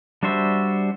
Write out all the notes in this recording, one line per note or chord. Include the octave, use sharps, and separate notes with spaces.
G3 D4 F#4 C5 E5